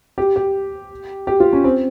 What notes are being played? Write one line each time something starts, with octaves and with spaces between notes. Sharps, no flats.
G4
G4
G4
F4
C#4
C4